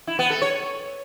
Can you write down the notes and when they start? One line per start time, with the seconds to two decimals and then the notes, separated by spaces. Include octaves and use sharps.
0.07 E4
0.19 B3
0.30 A4
0.42 C#5